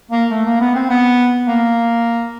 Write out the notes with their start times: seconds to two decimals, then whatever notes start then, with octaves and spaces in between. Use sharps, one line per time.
0.11 A#3
0.31 A3
0.46 A#3
0.61 B3
0.75 C4
0.90 B3
1.48 A#3